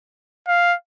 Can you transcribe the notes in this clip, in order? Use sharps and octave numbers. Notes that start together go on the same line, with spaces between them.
F5